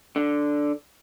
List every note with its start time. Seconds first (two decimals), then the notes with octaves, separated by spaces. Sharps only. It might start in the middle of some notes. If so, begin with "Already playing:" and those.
0.16 D3